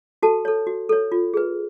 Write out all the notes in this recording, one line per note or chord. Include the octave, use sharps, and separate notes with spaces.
F#4 A4 A5
A4 C#5
F#4
A4 C#5
F4
G#4 B4